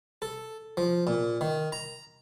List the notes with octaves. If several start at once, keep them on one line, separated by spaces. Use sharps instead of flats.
A4
F3
A#2
D#3
A#5